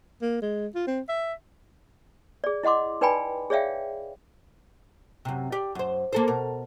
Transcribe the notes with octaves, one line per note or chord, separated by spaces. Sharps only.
A#3
G#3
F4
C4
E5
G#4 D5
E4 D#5 F#5 C6 D6
D#4 B4 D5 G5 G#5 B5
G#4 C#5 D5 E5 F5 G5
F#2 C3
G4 D5
F#2 C5
A#3 A4 C5
B2 A#4